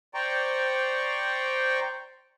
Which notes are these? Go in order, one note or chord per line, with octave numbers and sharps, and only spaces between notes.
C5 D5 G5 A#5 C#6